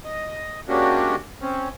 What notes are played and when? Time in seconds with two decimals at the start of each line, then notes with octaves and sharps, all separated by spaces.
0.05 D#5
0.68 G#3 A#3 C#4 D4 F#4 G4
1.42 C4 C#4